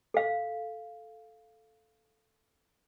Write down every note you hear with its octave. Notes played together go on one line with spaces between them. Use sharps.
A4 F5